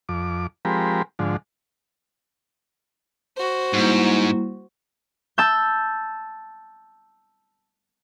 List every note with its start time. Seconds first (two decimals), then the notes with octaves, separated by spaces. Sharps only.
0.09 F2 D6
0.65 F3 G#3 C4 G4 A#4 B5
1.19 G#2 D3 F3
3.37 F#4 C5
3.73 G#2 G3 A#3 E4
5.38 A5 E6 G6